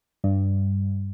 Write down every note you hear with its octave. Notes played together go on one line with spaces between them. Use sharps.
G2